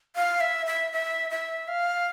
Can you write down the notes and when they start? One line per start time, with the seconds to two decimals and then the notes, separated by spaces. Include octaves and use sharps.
0.16 F5
0.40 E5
0.66 E5
0.92 E5
1.30 E5
1.68 F5